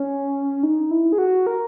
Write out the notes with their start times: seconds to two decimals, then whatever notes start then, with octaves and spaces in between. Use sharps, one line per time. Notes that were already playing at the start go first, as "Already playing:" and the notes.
Already playing: C#4
0.63 D#4
0.91 E4
1.12 G#4
1.18 F#4
1.47 A#4